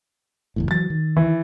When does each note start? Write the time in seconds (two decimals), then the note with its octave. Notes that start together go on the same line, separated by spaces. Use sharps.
0.56 F#1 E2 A2
0.71 E3 F#3 A6
0.90 D#3
1.16 E3